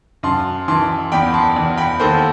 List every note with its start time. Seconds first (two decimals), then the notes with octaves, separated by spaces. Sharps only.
0.23 F#2 A5 C6
0.68 E3 A5 C6
1.12 E2 G5 B5
1.33 A5 C6
1.56 E2
1.78 G5 B5
2.00 D#2 A4 C5